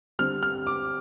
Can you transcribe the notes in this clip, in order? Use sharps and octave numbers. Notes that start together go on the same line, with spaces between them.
D3 G3 C4 F6
F6
D6